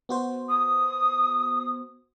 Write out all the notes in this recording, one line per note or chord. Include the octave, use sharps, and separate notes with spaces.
B3 F#4 C5
D#6